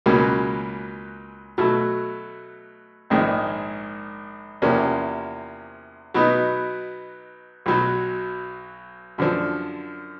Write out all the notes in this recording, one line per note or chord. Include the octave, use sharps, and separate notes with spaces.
C#2 B2 F#3 A#3 C#4
B2 F#3 A3
A#1 G#2 D#3 G#3
E2 C3 F3 A#3 C#4
B2 F#3 B3 D#4
B1 B2 F#3
F#2 D3 F3